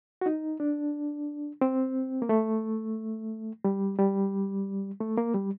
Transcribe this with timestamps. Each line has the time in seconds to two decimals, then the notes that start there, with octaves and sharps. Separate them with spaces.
0.21 F#4
0.26 D#4
0.60 D4
1.61 C4
2.22 A#3
2.29 A3
3.64 G3
3.99 G3
5.00 A3
5.17 A#3
5.34 G3